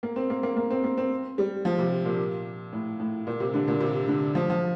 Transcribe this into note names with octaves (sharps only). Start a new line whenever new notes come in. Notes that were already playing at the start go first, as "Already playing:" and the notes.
A#3
C4
A#3
A#3
A#3
C4
A#3
C4
G3
F3
C3
A#2
A2
A2
A#2
C3
D3
A#2
C3
D3
F3
F3